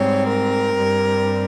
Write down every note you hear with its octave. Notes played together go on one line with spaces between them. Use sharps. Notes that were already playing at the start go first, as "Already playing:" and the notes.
Already playing: G#2 G3 C4 C#5
A#4
G2 G3 C4